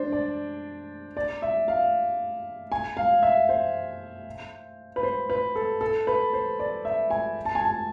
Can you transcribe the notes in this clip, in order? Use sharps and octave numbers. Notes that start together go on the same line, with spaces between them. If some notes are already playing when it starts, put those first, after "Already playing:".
Already playing: D4 C5
D5
D5
E5
F5
G#5
F5
E5
C5
B4
C5
B4
A4
A4
B4
C5
D5
E5
G#5
A5
G#5
A5